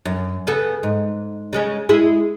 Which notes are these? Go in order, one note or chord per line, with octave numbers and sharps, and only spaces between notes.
F#2
C#3 B3 A4
G#2
C#3 G#3 C#4
G#3 E4 G#4